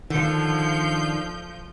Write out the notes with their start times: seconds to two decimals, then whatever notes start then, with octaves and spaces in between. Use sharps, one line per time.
0.10 D3 D#3 F3 G6